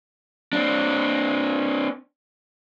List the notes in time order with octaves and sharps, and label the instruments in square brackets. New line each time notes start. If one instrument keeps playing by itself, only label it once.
[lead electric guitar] C4 D4